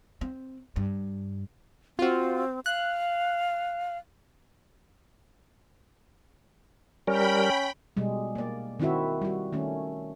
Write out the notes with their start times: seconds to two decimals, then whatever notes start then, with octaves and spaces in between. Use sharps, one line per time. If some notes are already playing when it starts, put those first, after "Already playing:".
0.21 C4
0.76 G2
1.99 C4 F4 F#4
2.66 F5 F#6
7.07 G3 C#4 A#4 G5 B5
7.97 B2 G3 G#3
8.35 A#3 D5
8.80 D#3 C4 E4 F#4 E5
9.22 G3 F#4
9.52 D#3 A3 C#4